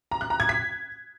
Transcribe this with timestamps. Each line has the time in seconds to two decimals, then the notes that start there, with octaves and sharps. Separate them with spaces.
0.11 A#5
0.21 F#6
0.30 A#5
0.40 G#6
0.49 B6